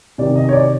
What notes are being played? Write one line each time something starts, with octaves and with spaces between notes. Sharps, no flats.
C3 D#3 D5
D#5
C#5
D5